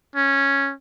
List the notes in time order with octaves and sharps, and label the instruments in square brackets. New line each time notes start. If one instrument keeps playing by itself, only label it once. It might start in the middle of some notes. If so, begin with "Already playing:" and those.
[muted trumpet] C#4